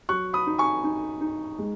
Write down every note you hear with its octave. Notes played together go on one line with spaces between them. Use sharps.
F#3 C#6 F#6
B5 D#6
D#4
G#5 C#6
D#4
D#4
G#3